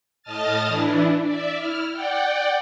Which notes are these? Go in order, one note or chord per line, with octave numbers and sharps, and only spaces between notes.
A2 D#5 A5 D#6 F6 A6
E3 D4 E4
D5 E5
E4 F6
D5 F#5 G5